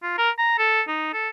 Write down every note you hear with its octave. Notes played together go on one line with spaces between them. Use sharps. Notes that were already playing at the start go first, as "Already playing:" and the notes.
F4
A#4
A#5
A4
D#4
A4